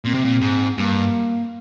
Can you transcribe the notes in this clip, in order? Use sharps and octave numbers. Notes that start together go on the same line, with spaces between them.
A#2 C4
C3
A#2
G#2
G2 A#3